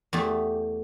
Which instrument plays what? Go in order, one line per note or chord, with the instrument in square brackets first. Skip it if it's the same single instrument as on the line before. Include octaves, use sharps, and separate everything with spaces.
[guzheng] E2 A3 G4